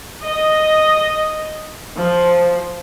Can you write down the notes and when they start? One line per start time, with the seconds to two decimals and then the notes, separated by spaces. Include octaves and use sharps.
0.24 D#5
1.96 F3